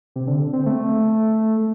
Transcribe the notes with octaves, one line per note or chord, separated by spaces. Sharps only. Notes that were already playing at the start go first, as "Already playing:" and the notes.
C3
D3
C4
A3